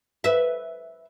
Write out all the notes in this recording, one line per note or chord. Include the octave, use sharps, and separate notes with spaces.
B4 E5